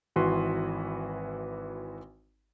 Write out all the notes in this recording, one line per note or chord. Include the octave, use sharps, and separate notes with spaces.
G#1 E3 F#4 B4 C6